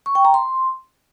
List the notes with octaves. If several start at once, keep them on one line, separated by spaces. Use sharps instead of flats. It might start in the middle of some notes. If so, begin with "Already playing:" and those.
C#6
G5
A#5
C6